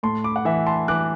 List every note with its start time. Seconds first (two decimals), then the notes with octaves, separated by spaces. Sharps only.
0.03 A2 A5 C6
0.24 B5 D6
0.36 F#5
0.45 E3 E5
0.67 A5 C6
0.88 E3 D6 F#6